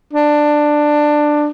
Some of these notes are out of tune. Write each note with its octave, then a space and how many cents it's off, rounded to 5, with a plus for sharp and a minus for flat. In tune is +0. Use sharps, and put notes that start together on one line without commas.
D4 +15